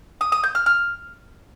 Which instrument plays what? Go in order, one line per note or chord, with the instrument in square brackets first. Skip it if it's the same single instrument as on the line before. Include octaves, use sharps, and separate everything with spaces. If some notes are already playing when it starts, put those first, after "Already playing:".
[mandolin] D#6
D#6
G6
F6
F6